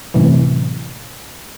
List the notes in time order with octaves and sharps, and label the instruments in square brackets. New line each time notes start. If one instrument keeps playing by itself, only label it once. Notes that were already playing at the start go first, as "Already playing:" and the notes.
[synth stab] F#2 A2 C3 E3